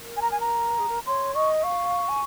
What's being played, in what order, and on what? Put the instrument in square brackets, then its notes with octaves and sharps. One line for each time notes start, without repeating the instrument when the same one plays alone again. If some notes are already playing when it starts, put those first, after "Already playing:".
Already playing: [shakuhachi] A#4
[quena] G#5
A#5
G#5
A#5
[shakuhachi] G#4
A#4
[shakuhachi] C#5 [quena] C6
[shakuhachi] D#5 [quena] C#6
[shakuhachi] F5 [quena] C#6
[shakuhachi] G#5